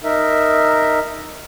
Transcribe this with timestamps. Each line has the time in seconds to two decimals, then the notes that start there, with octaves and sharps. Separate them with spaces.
0.04 D#4 A#4 E5